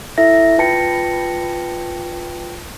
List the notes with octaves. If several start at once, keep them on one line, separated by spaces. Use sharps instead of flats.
E4 A4 E5 A#6
F4 B4 G5 A5 A#6 C#7